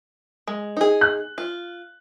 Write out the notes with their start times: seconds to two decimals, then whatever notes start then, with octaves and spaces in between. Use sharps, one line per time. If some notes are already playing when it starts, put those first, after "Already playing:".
0.47 G#3
0.77 D#4 G#4
1.01 F#6
1.38 F4